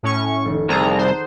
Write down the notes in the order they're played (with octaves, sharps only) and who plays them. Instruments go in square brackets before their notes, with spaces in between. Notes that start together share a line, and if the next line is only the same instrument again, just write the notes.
[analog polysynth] A2 C#4 C#6
[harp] F1 D#3
[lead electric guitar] C2 [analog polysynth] G#4 A#5 [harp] D5 A5 A6
[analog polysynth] C5 [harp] F#5 D#6